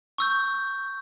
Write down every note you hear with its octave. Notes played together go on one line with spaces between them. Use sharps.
C#6 E6 G6